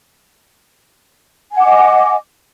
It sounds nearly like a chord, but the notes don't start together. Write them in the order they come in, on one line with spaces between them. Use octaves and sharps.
G#5 F#5 D6 D#5